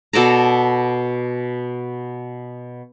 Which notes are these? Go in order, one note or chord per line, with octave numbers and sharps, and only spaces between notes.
B2 A4 D5 A#5